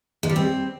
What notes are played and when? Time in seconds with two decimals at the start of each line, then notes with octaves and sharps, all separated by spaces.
0.23 G#3
0.29 G3
0.36 C4